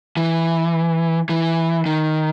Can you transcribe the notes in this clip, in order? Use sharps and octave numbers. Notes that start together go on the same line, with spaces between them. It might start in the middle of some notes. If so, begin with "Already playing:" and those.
E3
E3
D#3